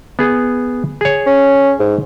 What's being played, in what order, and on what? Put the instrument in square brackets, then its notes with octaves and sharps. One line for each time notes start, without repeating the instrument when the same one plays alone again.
[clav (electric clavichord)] B3 G#4
G#4 C#5
[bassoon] C#4
G#2